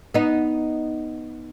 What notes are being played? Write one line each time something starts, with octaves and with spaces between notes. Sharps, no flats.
B3 D#4